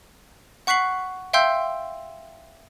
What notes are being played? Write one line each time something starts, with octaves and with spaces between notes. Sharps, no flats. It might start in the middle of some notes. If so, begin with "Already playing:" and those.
F#5 C#6 F#6 B6 C7 F#7
E5 F5 G5 C6 E6 G6